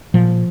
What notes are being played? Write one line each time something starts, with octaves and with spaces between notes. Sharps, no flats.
A#2 F3